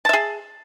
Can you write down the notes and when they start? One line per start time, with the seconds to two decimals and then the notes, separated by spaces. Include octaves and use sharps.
0.05 A5
0.09 E5
0.13 G#4